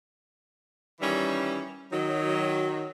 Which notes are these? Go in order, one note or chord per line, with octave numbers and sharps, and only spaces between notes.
D#3 E3 G3 C#4
D#3 F#3